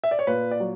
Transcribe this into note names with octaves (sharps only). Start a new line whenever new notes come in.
E5
D5
C#5
A#2 B4
D5
F#3